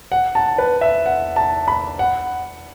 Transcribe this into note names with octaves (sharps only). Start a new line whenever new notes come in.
F#5
A5
B4
E5
F#5
A5
B5
F#5